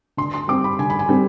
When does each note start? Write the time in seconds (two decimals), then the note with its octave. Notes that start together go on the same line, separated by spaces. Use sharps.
0.17 D3 C6
0.34 C6
0.48 G3 C4 D6
0.64 B5
0.79 D3 G#5
0.90 B5
0.99 G#5
1.09 G3 C4